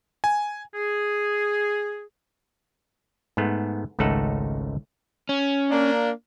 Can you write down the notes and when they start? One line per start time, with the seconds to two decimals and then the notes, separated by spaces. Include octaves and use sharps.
0.24 G#5
0.75 G#4
3.37 G#2 A3 B3
3.99 G#1 C#2 A3 D#4 A4 F#5
5.29 C#4
5.71 A#3 D4